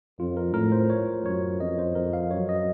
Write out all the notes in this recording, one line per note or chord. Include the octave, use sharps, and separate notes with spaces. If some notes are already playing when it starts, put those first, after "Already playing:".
F2 F4
A#4
A2 A#4
C5
C#5
F#2 C#5
F2 D#5
C5
F2 A#4
F5
F#2 C#5
D#5